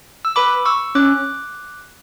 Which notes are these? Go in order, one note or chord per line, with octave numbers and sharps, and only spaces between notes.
E6
B4 B5 D6
C#6 E6
C#4 D6 F#6